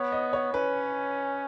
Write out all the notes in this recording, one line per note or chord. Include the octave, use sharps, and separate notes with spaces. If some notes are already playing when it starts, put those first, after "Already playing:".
Already playing: B3 C#5
D#5
C#5
C#4 B4